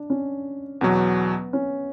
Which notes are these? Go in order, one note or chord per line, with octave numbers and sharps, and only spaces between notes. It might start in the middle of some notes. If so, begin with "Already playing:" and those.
Already playing: D4
C#4
E2 B2 F#3 B3
C#4